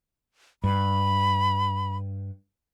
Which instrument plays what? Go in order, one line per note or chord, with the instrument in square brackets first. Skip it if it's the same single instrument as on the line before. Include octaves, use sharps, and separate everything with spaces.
[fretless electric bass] G2 [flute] B5